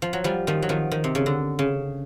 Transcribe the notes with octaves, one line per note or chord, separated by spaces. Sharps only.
F3
F#3
F3 G3
D#3 F3
F#3
D#3 F3
D#3
C3
C#3
D3
C#3